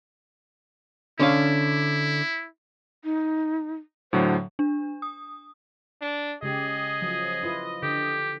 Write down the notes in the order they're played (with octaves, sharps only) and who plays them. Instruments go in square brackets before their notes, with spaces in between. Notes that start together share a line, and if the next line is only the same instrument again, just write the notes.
[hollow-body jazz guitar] D3 C#4 F5 [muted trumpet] E4
[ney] D#4
[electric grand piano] A2 D3 F#3 [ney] C5
[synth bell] D4
D#6
[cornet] D4
[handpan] C#3 G#3 G4 [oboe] G#4 [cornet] D#5
[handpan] F3 F#3
E4 F4 B4
[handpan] D3 [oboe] G4